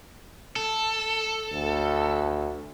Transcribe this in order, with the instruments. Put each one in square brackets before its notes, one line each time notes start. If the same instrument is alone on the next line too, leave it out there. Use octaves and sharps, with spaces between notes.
[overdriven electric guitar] A4
[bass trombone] D2